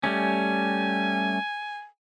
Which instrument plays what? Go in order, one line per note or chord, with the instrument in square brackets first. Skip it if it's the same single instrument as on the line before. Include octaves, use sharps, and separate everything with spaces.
[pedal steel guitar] G3 A3 C#4 [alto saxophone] G#5